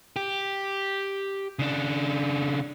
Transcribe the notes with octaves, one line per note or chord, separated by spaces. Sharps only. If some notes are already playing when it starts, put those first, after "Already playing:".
G4
C#3 D4